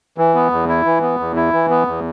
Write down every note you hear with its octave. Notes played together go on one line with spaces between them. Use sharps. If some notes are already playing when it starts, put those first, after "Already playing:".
E3
B3
E2
E4
E3
B3
E2
E4
E3
B3
E2